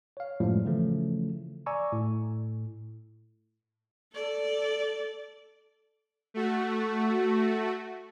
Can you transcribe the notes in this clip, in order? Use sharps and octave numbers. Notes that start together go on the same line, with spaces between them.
C#5 F5
F#2 A2 F3 G3 G#3
C#3 E3 F3 A3 C#4
D5 G#5 A#5 C#6 D6 E6
A2
A4 D5
A3 F#4